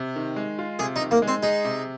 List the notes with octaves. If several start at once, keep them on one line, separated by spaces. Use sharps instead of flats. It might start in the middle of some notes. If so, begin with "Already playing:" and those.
Already playing: C3
D#3
G#3
F4
C3 G#4
D#4
D#3
A#3
G#3
C4
D#4 G#4
C3